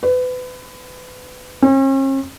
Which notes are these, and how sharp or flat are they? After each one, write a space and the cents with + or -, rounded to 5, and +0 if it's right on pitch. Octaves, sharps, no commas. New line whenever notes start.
B4 +30
C#4 -45